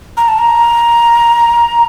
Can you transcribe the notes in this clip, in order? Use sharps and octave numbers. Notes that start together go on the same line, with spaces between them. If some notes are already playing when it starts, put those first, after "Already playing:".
A#5
A5
A#5